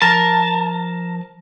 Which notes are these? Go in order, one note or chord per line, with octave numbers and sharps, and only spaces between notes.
F3 A#4 A5